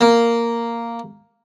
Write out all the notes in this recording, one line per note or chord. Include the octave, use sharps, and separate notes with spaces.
A#3